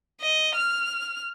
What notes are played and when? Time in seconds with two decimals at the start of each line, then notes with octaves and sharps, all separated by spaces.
0.21 D#5
0.56 F6